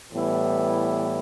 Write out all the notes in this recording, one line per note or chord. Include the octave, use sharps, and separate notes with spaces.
A2 E3 G3 B3 E4